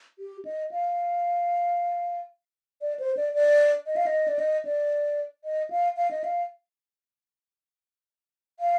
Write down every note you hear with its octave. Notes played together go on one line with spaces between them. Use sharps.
G4
D#5
F5
D5
C5
D5
D5
D#5
F5
D#5
D5
D#5
D5
D#5
F5
F5
D#5
F5
F5